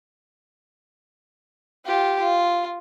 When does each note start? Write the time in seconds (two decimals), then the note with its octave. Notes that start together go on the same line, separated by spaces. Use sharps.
1.86 F4 G4
2.19 F4